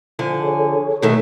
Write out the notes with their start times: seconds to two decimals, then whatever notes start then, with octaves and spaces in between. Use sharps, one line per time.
0.19 D3 F3 G#5
0.43 G#4 A4 C#5
1.02 B2 D#3 A3